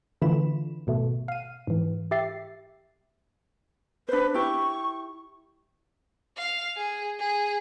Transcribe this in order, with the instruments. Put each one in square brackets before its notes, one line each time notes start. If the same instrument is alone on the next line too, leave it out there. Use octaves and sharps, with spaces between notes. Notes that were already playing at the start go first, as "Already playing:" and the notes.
[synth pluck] D3 E3 A3 F4 B5 E7
G#1 B2 A3
F5 D#7
G#2 E3
G4 E5 A6 C7
[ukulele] D4 C5 [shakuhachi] B4
[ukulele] E4 G4 [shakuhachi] C#6
[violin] F5
G#4
G#4